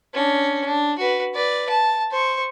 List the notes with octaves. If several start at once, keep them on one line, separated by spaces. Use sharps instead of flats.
C#4 D4
D4
F#4 B4
B4 D5
A5
C5 C#6